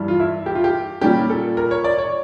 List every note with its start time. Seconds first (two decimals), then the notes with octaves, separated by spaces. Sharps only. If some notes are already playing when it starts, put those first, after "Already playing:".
Already playing: G2 E3 G3
0.08 F4
0.20 E4
0.46 G4
0.55 F4
0.64 G4
1.01 A#2 G3 A#3 C#4 G4
1.30 A4
1.57 A#4
1.71 C#5
1.84 D5
1.98 C#5